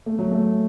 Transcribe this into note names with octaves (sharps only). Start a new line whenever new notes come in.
A3
F#3
A3